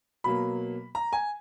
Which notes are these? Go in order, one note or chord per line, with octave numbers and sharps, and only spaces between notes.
B2 F#3 A#3 B5
A#5
G#5